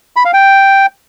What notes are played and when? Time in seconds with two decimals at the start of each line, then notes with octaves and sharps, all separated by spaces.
0.16 B5
0.25 F5
0.33 G5